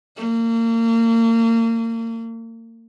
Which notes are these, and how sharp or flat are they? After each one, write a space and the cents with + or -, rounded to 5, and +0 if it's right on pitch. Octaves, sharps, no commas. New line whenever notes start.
A#3 -35